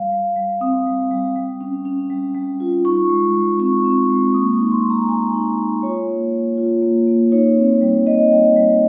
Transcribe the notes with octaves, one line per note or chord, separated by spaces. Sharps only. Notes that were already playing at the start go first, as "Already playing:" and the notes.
Already playing: G3 F5
G3
G3
C4 D#6
G3
G3
G3
C#4
C#4
G3
G3
F4
D#4 C#6
G#3
G#3
C4 C#6
C4
G#3
A#3 D#6
C#6
D#4
C6
A#3
A#5
A#3 G#5
D#4
D#4
F4 C#5
A#3
A#3
F4
A#3
A#3
D#4 C#5
C4
G3
G3 D#5
G3
G3